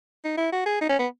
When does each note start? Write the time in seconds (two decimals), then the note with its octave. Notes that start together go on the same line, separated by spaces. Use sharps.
0.24 D#4
0.37 E4
0.52 F#4
0.66 G#4
0.81 D#4
0.89 C#4
0.99 B3